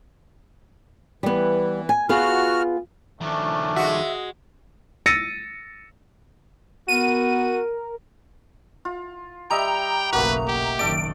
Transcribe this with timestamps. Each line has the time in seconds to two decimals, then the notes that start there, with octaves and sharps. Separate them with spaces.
1.23 E3 G3 B3
1.89 G#5
2.09 B3 F4 F#4 G#4 F6
3.21 D#3 F3 A3 C#4 D4
3.76 G#3 F#4 E5
5.06 E6 A6 A#6 C#7 D#7
6.88 B3 F#4 A#4 D#7
8.85 F4
9.50 G3 D#5 E5 G5 A#5
10.13 F#1 B1 A3 A#3 F#4 B4
10.48 G4
10.79 F#1 D#3 A4 D5 D7